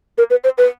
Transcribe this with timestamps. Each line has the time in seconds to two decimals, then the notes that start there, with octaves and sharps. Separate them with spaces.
0.18 A#4
0.30 B4
0.44 C5
0.58 B4